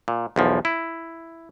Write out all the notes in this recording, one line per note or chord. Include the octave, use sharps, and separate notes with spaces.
A#2
B1 E2 F3
E4